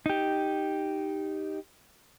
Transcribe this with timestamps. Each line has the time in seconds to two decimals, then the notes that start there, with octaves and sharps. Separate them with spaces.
0.06 D#4 G4